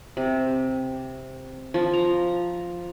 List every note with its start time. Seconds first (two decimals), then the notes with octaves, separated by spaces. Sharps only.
0.17 C3
1.74 F3
1.93 A#5